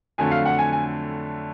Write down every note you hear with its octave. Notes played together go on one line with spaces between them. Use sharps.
F2 D3 F#3 A3 G#5
F5
F#5
G#5
G#5